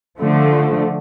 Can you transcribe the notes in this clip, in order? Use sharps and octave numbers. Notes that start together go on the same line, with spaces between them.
D3 F3 A3